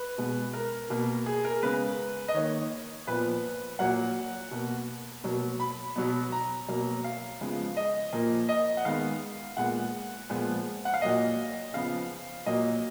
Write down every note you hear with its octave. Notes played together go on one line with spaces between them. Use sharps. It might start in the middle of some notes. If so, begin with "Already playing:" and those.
Already playing: B4
B2 G#3 B3
A#4
B2 A#3
G#4
A#4
C#3 G#3 B3 B4
D#5
D#3 A#3 C#5
A#2 F3 B3 B4
A#2 F#3 A#3 F#5
B2 A#3
B2 F#3 A#3
B5
B2 F#3 B3
A#5
B2 F#3 A#3
F5
C#3 F3 G#3 B3
D#5
A#2 F3 A#3
D#5
F#5
D#3 G#3 B3 F5
A#2 G#3 B3 F#5
A#2 F3 G#3 B3
F#5
F5
A#2 F#3 A#3 D#5
C#3 F3 B3 F5
A#2 F#3 A#3 D#5